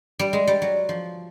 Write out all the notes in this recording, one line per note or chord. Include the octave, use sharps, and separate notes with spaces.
G3
G#3
G3
F#3
F3